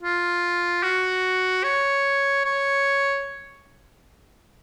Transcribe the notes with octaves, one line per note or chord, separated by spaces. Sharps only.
F4
F#4
C#5
C#5